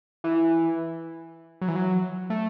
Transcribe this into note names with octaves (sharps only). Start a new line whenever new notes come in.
E3
F#3
E3
F#3
A3